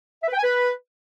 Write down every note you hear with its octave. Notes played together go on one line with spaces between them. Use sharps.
E5
B4
G5
G#5
B4